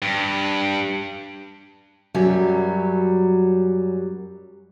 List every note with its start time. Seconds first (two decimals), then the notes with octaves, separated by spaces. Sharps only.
0.02 G2
2.14 F#2 F#3 G3